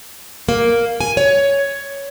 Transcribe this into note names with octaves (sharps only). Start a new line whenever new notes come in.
A#3
G#5
C#5